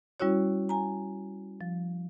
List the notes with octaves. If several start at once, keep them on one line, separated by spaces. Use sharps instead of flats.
G3 C#4 E4 F#4 C#5
G#5 A#5
F3